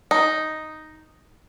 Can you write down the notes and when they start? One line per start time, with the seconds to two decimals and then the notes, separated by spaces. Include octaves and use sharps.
0.11 D#4